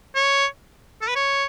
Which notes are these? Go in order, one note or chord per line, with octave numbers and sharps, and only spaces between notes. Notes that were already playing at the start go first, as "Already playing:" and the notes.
C#5
A4
B4
C#5